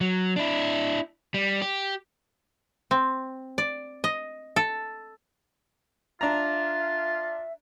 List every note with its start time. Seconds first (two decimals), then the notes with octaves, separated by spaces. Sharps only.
0.01 F#3
0.36 D4 E4
1.34 G3
1.62 G4
2.91 C4
3.58 D5
4.04 D#5
4.56 A4
6.21 D4 F4 E5 A#5